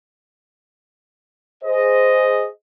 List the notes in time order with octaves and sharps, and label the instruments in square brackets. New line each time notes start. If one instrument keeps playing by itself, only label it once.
[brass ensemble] G#4 C5 D#5